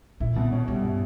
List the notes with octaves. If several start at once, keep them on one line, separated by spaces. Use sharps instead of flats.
A#2 E4
B2
C#4
G2 G3
E4